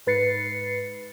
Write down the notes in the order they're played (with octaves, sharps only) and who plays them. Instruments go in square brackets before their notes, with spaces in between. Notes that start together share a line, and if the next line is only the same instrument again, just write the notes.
[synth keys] G#2 B4 A6 C7 C#7